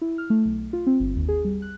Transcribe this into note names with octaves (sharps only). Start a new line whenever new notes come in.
E4
F6
A3
B1
F4
C4
G1
D#2
G#4
G3
F#6